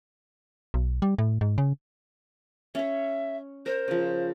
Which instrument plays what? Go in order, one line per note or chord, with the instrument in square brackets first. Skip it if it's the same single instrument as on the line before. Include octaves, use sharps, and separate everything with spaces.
[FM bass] B1
G3
A2
G#2
C#3
[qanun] C#4 C#5 [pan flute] E5
[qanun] A#4 [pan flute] C5
[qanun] C#3 F3